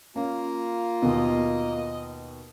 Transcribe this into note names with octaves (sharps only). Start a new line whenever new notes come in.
A#3 C#4 F4
D#2 B2 D#5